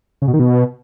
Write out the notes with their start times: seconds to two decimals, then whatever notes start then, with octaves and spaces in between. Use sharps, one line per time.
0.22 C#3
0.28 B2
0.33 D#3
0.39 B2